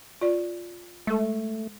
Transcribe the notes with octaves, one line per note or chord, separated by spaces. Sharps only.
F4 D5
G#3 A3 A4